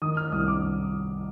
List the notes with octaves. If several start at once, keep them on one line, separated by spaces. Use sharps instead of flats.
D#3 D#6
F6
C2 D#6
D6